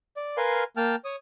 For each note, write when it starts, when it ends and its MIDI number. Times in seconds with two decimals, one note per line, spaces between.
0.17 0.37 74
0.37 0.64 70
0.37 0.64 71
0.37 0.64 77
0.37 0.64 80
0.37 0.64 84
0.77 0.96 58
0.77 0.96 79
0.77 0.96 81
0.77 0.96 89
1.05 1.16 73
1.05 1.16 87